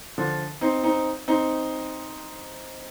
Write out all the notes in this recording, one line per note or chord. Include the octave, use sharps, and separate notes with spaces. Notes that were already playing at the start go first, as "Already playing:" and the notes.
D3 F3
C4 D#4
C4 D#4
C4 D#4